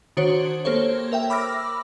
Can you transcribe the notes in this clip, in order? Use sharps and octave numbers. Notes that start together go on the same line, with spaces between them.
D#3 D4 F#4 C5 C#5
A#3 G4 A4 C5 C#5
A#4 E5 G5
B5 D6 E6 F6 A#6